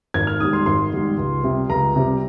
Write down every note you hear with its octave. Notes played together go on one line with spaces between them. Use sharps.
G#1 G#6
F6
G#2 G3 D#6
C6
G#1 C6
G#2 G3
C#2
C3 G3
C#2 A#5
C3 G3